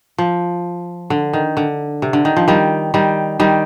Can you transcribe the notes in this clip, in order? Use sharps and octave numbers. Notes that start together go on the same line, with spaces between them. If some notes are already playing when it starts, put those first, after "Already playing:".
F3
D3
D#3
D3
C3
D3
D#3
F3
D#3 G3
D#3 G3
D#3 G3